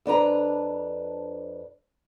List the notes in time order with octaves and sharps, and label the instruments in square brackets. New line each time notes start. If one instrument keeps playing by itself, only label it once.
[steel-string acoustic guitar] F2 D4 B4 A#5